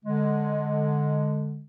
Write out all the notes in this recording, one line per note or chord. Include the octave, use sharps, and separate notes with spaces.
D3 G#3